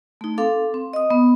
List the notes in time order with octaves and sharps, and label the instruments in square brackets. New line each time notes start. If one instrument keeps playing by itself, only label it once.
[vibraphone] A3 D#4
C4 A4 F5 D6
C4
D#5 D#6
B3